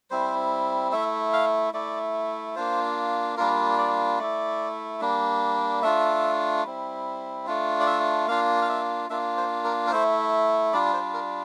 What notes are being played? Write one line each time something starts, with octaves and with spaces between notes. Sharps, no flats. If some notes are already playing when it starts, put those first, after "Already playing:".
G3 C4 E4 C5
A3 E4 E5
F5
A3 E4 D5
A#3 D4 F4 C5
G3 A#3 D4 F4 A#4
D5
A3 E4 D5
G3 A#3 D4
A3 D4 F4 E5
G3 C4 E4
A3 D4 F4
D5
E5
A#3 D4 F4 F5
F5
E5
A#3 D4 F4 E5
C5
A#4
A#4
A3 E4 C5
G3 D4 F4 D5
C5
A#4